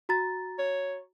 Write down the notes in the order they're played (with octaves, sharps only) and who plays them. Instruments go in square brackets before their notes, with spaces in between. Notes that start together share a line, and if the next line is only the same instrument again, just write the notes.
[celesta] F#4 A#5 A6
[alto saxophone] C#5